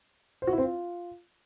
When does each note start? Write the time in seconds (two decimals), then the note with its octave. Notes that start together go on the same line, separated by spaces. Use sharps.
0.42 C5
0.47 F#4
0.53 E4
0.58 C4
0.63 F4